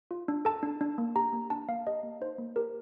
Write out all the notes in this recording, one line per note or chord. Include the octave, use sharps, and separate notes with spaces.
F4
D4
A4 A5
D4
D4
A#3
G4 A#5
A#3
D4 A5
A#3 F5
G4 D#5
A#3
D#4 C5
A#3
G4 A#4